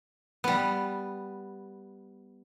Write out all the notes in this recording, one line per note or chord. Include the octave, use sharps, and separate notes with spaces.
G3 B3